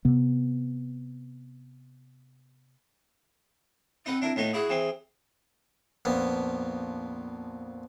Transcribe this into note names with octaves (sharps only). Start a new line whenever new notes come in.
C3 B3
C4 D#4 B4 F#5
D4 E4 A#4
A2 B3 D#4
E4 F#4 G#4
E3 C4
A#1 F2 B3